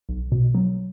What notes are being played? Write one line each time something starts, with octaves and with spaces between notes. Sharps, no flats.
B1
B2
F#3